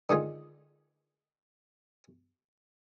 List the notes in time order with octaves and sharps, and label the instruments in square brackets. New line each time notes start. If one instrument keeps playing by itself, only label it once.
[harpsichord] D3 D#3 G#3 F4